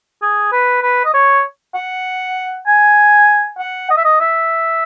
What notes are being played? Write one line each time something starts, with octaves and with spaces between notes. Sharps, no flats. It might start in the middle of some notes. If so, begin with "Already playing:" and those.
G#4
B4
B4
D#5
C#5
F#5
G#5
F#5
D#5
E5
D#5
E5